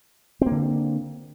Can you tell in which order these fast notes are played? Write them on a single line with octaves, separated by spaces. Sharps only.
C4 A#3 D3